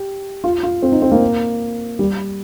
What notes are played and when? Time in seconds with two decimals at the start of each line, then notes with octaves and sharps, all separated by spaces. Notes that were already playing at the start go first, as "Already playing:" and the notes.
Already playing: G4
0.44 F4
0.63 F4
0.82 C4
0.92 D#4
1.02 C4
1.12 A#3
1.99 G3